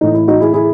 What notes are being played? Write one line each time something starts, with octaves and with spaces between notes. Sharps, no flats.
A2 E3 D#4
E4
D#4 F#4
E4 G#4
E4 G#4